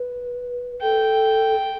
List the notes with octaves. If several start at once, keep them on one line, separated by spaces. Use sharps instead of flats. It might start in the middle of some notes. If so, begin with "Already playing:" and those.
Already playing: B4
A4 G5